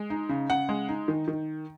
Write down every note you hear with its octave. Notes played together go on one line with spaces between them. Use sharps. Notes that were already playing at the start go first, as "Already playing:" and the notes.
Already playing: G#3
D#4
C#3
C#3 F#5
G#3
D#4
D#3
D#3